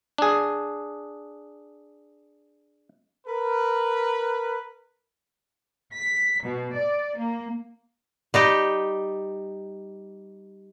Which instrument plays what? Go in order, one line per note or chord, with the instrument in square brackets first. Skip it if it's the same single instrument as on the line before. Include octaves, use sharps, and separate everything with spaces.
[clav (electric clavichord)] D4 G#4
[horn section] A#4 B4
[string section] B6
B2
D5
A#3
[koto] G3 D#4 G4